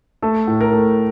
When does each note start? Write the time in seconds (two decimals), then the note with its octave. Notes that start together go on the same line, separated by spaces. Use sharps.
0.22 A3 A4
0.47 A2
0.61 A#4
0.73 A3